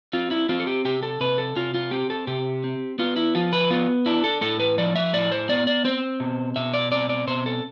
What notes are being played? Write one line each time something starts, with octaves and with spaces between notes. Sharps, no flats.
C4 F4
E4
C4 F4
A4
G4
C3 G4
A4
C3 B4
A4
C3 F4
F4
C4 G4
A4
C3 G4
C4
B3 F4
E4
F3 F4
B4
B3 F4
D4 E4
A4
A2 A4
B4
F3 D5
E5
A2 D5
C5
B3 D5
D5
C4 C5
B2
B2 E5
D5
C4 D5
D5
B2 C5
A4